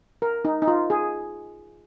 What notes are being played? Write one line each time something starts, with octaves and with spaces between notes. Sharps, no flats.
A#4
D#4
D#4
F4
G#4